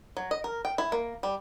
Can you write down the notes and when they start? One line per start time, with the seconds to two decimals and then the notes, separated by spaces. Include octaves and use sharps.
0.17 F#3
0.31 D#5
0.44 A#4
0.65 G5
0.78 E4
0.92 A#3
1.23 G3